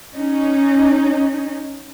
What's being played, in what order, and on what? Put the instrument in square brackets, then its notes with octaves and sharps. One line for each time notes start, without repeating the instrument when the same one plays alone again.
[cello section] C#4 D#4